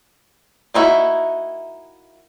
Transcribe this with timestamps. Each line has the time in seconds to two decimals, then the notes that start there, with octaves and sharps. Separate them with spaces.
0.74 A#3 D#4 E4 F#4